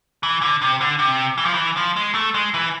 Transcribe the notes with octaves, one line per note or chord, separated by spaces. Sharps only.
E3
D3
C3
D3
C3
E3
F3
E3
F3
G#3
A3
G#3
E3